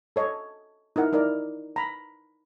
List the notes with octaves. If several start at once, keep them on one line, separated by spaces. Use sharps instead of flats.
A4 C#5 D#5
D#4 E4 A#4 F#5
D#4 E4 A#4 D5
A#5 B5